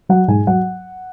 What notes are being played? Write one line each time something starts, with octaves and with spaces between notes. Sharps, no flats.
F#3 F#5
G#2 G#5
F#3 F#5